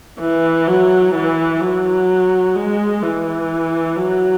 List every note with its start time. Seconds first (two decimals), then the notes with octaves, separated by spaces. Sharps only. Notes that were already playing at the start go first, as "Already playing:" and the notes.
0.20 E3
0.68 F#3
1.15 E3
1.61 F#3
2.55 G#3
3.02 E3
3.96 F#3